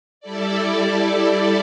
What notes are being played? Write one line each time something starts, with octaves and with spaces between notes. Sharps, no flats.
G3 E4 A4 D5